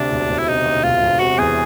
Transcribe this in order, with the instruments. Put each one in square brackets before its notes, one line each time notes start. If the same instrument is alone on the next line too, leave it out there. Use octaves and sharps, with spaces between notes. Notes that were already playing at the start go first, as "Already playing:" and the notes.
Already playing: [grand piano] D2 C3 [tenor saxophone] D4
[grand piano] E1
E1
[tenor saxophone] E4
[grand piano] C3 [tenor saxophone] D#4
[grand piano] D2
[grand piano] E1 [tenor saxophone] F4
[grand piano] E1
[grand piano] C3 [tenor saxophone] F#4
[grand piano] E2 [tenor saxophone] G#4